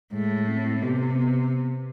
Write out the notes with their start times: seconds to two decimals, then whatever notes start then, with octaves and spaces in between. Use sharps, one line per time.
0.13 A2 G#3
0.48 C4
0.82 C3 B3
1.15 B3